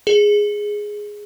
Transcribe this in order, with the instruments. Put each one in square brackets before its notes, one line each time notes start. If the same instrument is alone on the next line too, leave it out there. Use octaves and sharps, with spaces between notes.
[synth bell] G#4